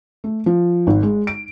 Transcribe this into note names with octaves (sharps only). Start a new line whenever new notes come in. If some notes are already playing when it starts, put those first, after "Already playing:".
A3
F3
G#1
G#3
D7